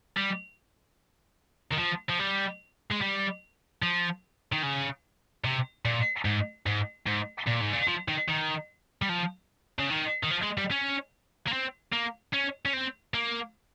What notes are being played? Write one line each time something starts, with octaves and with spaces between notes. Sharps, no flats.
G3
D#3
F3
F3
G3
G#3
G3
F3
D#3
C#3
C3
A#2
G#2
G#2
G#2
A#2
G#2
A#2
F3
D#3
D#3
G3
F3
C#3
D#3
D#3
F3
G#3
G3
C#4
A#3
C4
A#3
C#4
C#4
C4
A#3